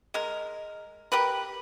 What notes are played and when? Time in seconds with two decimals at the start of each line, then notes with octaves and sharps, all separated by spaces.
0.14 G#3 A#4
1.12 G4 A#4 B4